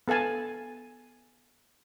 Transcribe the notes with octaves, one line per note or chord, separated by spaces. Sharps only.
B3 A4 F5 G#5 A5